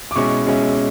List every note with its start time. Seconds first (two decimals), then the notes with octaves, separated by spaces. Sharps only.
0.11 D6
0.16 B2 G#3 C#4 E4 C#6
0.46 B2 G#3 C#4 E4